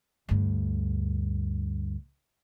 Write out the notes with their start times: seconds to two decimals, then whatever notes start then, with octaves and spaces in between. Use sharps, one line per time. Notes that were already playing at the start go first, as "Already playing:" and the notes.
0.29 D2 G2